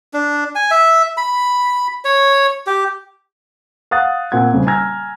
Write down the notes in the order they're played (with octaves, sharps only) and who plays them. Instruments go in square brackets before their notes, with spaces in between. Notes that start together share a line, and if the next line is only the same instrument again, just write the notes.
[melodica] D4
G#5
E5
B5
C#5
G4
[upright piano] F5 F#5 D#6 F#6 A6
A#2 C4 F#5 G#6
D#1 C#3
G#5 A#5 E6 F6 G#6 A#6